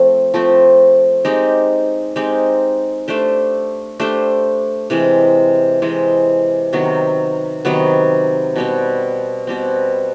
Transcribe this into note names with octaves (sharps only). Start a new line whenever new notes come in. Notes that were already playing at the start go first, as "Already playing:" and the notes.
Already playing: F3 A3 C4
F3 A3 C4
G#3 C4 D#4 G4
G#3 C4 D#4 G4
A3 D4 G4 C5
A3 D4 G4 C5
C3 E3 G#3 C4
C3 E3 G#3 C4
C3 D#3 F#3 B3
C3 D#3 F#3 B3
B2 G3 C4
B2 G3 C4